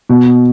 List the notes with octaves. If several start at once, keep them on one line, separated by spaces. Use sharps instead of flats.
B2